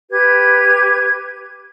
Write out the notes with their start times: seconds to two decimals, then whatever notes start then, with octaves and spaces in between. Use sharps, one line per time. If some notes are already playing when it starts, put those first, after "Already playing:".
0.10 G4 B4 G#6